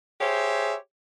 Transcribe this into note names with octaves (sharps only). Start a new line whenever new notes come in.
G4 G#4 C5 C#5 E5